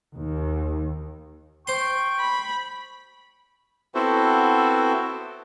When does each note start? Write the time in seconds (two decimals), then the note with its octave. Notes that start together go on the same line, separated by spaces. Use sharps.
0.16 D#2
1.67 C5 G5 C6 C#6
2.20 B5
3.95 B3 C4 E4 F#4 A4 C5